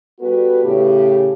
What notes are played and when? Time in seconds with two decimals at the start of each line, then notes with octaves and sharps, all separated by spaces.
0.21 G3 B3 F#4 A4 B4
0.64 A2 C#3 G4